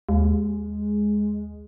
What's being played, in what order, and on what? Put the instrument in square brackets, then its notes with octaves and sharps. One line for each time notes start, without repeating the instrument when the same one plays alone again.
[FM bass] D#2 [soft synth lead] G#3